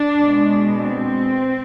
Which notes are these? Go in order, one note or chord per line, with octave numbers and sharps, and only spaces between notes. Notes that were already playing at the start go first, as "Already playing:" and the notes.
Already playing: D4
B2 G#3
C4